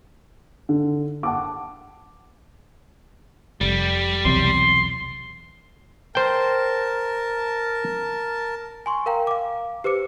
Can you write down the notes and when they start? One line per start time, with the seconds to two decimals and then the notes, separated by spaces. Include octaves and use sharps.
0.69 D3
1.23 F#5 A5 D6
3.61 F1 G3
4.25 B1 E2 C3 C6
6.15 A#4 C5 G5 A5
8.86 G#5 C6 C#6
9.06 A#4 F5 G5 A#5
9.27 F5 D6
9.84 G4 B4 C5 D6 C#7